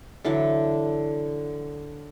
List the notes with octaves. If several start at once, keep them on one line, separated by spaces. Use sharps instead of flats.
D3 E3 F#3 D5